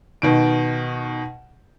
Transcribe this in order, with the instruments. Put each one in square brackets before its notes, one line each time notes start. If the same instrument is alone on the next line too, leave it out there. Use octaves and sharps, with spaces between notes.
[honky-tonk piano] B2 D#3 D7